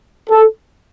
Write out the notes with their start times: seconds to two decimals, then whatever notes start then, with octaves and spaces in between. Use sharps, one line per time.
0.29 A4